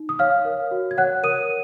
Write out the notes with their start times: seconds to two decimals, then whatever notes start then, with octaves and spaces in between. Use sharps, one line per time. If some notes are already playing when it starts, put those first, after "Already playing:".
Already playing: D#4
0.09 D#6
0.19 C#5 F5 F6
0.45 A#4
0.71 F#4
0.91 G#6
0.98 C#5 F#5 F#6
1.23 A#4 D#6 D#7